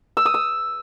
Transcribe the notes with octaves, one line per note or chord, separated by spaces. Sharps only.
E6
D#6
E6